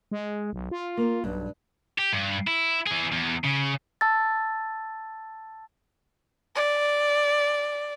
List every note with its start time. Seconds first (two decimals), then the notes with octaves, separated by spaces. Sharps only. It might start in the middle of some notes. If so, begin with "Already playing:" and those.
0.11 G#3
0.53 B1
0.71 F4
0.97 A#3
1.24 B1 G2
1.98 G4
2.13 G2
2.47 E4
2.87 E3 G#4
3.12 E2
3.44 C#3
4.01 A5 E6 A6
6.55 D5